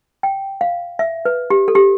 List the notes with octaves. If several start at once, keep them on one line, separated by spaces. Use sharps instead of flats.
G5
F5
E5
B4
G4
A4
G4